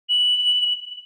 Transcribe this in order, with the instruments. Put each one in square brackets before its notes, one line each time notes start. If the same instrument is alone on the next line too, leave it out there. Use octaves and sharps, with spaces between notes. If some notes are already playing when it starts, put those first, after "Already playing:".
[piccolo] F#7